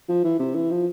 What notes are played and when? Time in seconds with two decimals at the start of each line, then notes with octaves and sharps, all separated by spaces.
0.09 F3
0.24 E3
0.39 C3
0.55 E3
0.71 F3